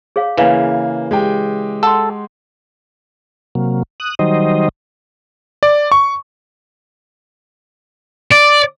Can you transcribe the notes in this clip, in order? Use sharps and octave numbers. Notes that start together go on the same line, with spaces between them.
G#4 C#5 F5
C#3 E3 A#3 B4 F5
G#3 G4 G5
A4 F#5 C6
C3 F#3 A#3
D#6 F#6
D#3 F#3 G3 D#4 C5 D#5
D5
C#6
D5